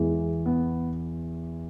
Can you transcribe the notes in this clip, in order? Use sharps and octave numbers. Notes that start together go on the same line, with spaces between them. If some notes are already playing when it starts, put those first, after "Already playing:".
Already playing: E2 E3 G#3
B3